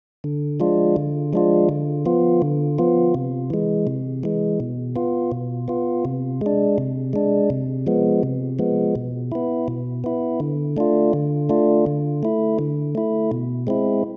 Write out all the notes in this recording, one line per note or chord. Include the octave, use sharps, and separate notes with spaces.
D3
F3 G#3 D4 F4
D3
F3 G#3 D4 F4
D3
F3 B3 F4
D3
F3 B3 F4
C3
E3 G#3
C3
E3 G#3
B2
B3 F4
B2
B3 F4
C3
G#3 D4
C3
G#3 D4
C3
F3 G#3 B3
C3
F3 G#3 B3
B2
B3 E4
B2
B3 E4
D3
A3 D4 F4
D3
A3 D4 F4
D3
A3 E4
D3
A3 E4
B2
G#3 C4 E4